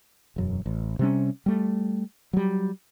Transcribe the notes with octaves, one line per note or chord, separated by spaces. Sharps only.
E1 F#2
A1
C3 G3 C#4
G3 A3
F#3 G3